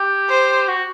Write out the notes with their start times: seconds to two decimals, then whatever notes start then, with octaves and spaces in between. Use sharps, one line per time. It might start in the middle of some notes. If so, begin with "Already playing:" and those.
Already playing: G4
0.29 C5
0.68 F#4